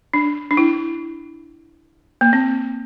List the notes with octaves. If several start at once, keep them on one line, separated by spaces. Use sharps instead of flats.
D4
D4
E4
A#3
C4